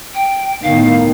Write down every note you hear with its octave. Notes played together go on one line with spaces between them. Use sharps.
G5
A2 D#3 B3 F5